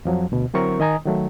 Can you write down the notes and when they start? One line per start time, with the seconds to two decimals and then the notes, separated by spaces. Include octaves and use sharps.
0.05 F2 F3 F#3
0.32 D2 B2
0.54 D3 F#3 C4 E4 A#4 C#6
0.80 D#3 D#5 G#5 A#5 D#6
1.05 D#3 F#3 A3